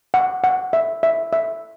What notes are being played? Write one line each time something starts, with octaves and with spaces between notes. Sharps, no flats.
F#5
F#5
E5
E5
E5